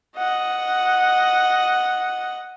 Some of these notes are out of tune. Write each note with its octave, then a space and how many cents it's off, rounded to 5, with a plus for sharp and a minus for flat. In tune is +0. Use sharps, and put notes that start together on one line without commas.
D#5 +0 F#5 +0